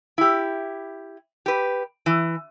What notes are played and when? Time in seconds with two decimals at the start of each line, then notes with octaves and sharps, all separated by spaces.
0.18 E4 G4
1.46 G4 B4
2.06 E3